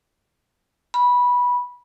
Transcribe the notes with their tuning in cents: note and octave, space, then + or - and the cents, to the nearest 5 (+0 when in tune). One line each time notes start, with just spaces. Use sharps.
B5 -15